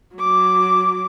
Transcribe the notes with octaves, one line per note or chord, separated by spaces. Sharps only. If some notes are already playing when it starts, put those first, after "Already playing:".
F#3 D6